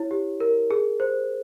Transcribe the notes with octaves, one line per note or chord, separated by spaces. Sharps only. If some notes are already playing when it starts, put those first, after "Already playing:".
Already playing: E4 C#5
G4
A#4
G#4
C5